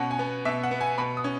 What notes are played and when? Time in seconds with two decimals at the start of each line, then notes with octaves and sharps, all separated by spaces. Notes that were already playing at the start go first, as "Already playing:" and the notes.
Already playing: B2 C#4 F#5
0.11 G#5
0.19 B3
0.45 B2 E5
0.63 F#5
0.71 B3
0.81 G#5
0.98 B2 B5
1.17 D#6
1.24 C#4